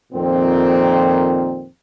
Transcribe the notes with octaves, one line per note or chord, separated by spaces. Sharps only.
F2 A#2 D#3 C4